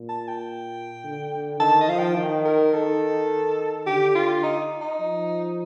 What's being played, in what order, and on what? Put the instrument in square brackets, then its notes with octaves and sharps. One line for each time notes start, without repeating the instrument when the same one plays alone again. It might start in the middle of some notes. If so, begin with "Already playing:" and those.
Already playing: [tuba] A#2
[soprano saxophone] A5
G5
[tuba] D3
[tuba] D#3 [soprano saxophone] A5
[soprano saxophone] D#5
[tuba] F3 [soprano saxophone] F5
[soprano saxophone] G5
[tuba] D#3
[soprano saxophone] A#4
[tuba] D#3 [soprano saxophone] A4
[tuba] D3 [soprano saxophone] G4
[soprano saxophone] F4
D#4
D#4
[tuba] F3